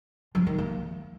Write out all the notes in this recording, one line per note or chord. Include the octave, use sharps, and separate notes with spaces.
F3
D#3
A#3